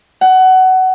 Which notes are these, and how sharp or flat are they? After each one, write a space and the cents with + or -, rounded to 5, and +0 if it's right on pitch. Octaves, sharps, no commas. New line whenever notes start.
F#5 +20